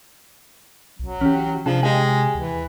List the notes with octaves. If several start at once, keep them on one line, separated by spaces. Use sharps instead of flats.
B1 F#3
E3 C#4 G4
C3 F3 D4 G#4 A5
G#3 G4 D#5 G#5
D#2 E3